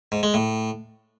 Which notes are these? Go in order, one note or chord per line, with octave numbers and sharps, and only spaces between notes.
G#2
G#3
A2